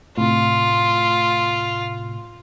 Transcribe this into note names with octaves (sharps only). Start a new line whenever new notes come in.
A2 C3 F4